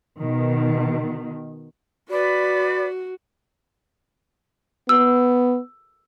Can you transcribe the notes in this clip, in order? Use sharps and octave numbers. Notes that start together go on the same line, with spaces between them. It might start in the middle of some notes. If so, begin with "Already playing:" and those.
B2 D#3
F#4 B4 D5 B5 D6
B3 E6